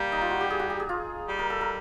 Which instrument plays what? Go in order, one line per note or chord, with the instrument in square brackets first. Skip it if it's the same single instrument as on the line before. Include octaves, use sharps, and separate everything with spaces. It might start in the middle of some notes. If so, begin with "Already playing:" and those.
Already playing: [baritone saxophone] G3 [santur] A#3
[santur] D#4
F4
F#4
G4
G#4
F#4
G4
G#4
F4
[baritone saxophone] G3
[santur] A#4
A4
A#4